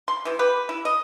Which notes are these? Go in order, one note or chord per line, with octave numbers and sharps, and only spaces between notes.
C6
C3 E3
G4 B4
E4
D#5